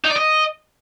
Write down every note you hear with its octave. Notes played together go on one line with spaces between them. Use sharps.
D#4
D5
D#5